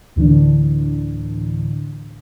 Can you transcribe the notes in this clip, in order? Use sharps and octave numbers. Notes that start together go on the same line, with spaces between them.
D2 A2 D3 E3 D4